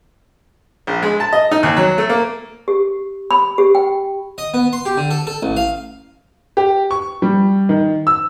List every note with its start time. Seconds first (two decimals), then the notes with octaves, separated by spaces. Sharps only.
0.87 A#1
1.02 G#3
1.20 A5
1.33 D#5
1.51 D#4
1.63 D#2
1.77 F#3
1.98 A3
2.10 A#3
2.68 G4
3.31 B5
3.58 G4
3.75 G5
4.38 D#5
4.54 B3
4.73 C6
4.86 G4
4.97 D3
5.11 A4
5.27 A4
5.43 A1
5.56 F5
6.57 G4
6.91 C#6
7.22 G3
7.69 D#3
8.07 E6